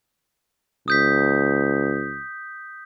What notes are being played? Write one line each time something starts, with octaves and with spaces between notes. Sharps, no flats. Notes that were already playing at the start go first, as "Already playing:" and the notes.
C#2 D#6 G6 B6